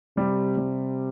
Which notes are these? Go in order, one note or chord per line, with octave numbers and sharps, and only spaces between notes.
C3 G3
G3